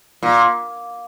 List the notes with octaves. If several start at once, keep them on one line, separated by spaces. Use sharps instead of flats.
A#2